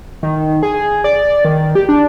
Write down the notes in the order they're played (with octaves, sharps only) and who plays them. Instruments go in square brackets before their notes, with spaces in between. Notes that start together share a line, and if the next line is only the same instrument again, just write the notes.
[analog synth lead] D#3
G#4
D5
D#3
G4
D4